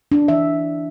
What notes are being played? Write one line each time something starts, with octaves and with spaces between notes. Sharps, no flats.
D4
E3 E5